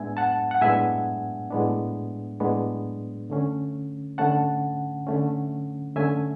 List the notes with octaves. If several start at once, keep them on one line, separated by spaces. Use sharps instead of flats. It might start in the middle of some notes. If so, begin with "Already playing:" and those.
Already playing: A2 G#3 B3 D4 E5 G#5
F#5 A5
F#5
A2 G#3 B3 D4 E5 G#5
A2 G#3 B3 D4
A2 G#3 B3 D4
D3 A3 C#4
D3 A3 C#4 F#5 A5
D3 A3 C#4
D3 A3 C#4 E5 G#5